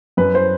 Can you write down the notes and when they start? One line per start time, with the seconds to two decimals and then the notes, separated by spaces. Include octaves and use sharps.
0.17 F#2 B4
0.35 C5